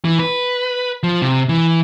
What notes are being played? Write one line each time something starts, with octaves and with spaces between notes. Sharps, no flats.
E3
B4
F3
C3
E3